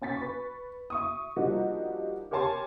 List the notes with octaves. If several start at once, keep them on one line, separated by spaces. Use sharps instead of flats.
C#4 G#5 A6 B6
B4 C#6
E5 C#6 D#6
F3 G3 A#3 D4 D#4 F#4
G4 A#4 C#5 G#5 A5 C6